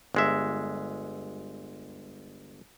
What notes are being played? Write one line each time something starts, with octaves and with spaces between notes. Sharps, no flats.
G1 G#3 E5